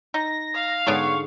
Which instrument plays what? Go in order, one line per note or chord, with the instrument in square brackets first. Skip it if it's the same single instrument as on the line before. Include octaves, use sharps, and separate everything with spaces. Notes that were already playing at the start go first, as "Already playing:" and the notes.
[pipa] D#4 [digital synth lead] A#6
[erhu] F5
[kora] G#2 D3 G#4 [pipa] B3 D4 C#5 [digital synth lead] C#6